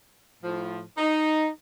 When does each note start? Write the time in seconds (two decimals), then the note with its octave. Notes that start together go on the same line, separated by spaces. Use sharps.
0.42 A2 F3
0.98 D#4